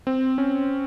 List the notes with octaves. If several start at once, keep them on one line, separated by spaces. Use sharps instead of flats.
C4
C#4